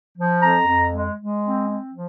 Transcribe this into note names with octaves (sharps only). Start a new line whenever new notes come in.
F3
F2 A#5
F2
G#3
G#3
C4
C4
F3